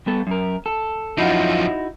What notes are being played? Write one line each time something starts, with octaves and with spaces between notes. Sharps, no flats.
G3 B3 A4
F#2 A#4
A4
F#2 F3 D#4 E4 F#4